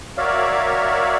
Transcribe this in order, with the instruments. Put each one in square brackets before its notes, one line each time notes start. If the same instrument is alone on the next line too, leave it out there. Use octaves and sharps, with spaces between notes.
[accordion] F#4 A#4 C#5 D5 E5 F5